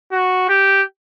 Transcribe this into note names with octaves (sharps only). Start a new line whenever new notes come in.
F#4
G4